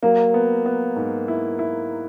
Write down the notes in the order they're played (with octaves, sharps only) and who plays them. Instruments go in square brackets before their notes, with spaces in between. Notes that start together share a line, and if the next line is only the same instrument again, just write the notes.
[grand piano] F#3 [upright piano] A#3
[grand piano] B3
B3
G#2
E4
E4